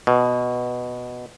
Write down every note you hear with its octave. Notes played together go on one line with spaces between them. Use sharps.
B2